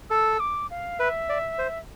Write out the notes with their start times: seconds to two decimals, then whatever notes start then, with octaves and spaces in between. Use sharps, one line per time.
0.10 A4 E6
0.40 D6
0.71 F5
0.99 B4 E5
1.29 D5
1.59 C5